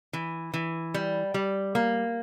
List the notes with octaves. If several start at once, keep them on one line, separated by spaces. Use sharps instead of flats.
E3
E3
G3
G3
A#3